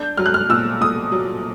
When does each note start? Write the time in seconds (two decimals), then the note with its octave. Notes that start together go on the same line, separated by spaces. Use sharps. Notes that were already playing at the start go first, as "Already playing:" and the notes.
Already playing: D4 G6
0.17 F#3 F6
0.26 F#6
0.34 F6
0.49 A#2 E6
0.81 A#2 D#6
1.12 F#3